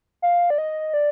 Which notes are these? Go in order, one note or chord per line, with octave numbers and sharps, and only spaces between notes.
F5
D5
D#5
D5